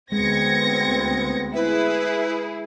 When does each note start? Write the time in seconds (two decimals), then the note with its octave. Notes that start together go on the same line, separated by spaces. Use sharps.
0.12 D2 G#3 B3 C4 G#6 A#6 C#7
1.55 E4 G#4 B4